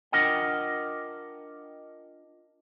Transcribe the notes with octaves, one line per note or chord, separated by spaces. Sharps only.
D4 F4 A#4 D#5 F#5 G5